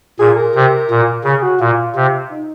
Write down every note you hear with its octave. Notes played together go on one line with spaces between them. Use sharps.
A#2 G#4
A#4
C3
A#2
C#3 G#4
F#4
A#2 F4
C3
D#4